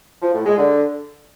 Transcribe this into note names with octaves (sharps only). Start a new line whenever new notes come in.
F3
A2
G#3
D3